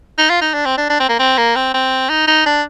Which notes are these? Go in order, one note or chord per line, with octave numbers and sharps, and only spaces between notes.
D#4
F4
D#4
D4
C4
D4
D4
C4
A#3
C4
A#3
C4
C4
D#4
D#4
D4